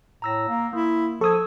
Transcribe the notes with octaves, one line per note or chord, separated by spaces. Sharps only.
A2 A#5 E6 A#6
A#3
A#3 E4
F3 A4 C#6 D#6 E6 G#6